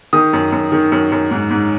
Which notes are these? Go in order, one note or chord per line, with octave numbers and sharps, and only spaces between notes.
D#3 D#6
F#2
F#2
D#3
F#2
F#2
G#2
G#2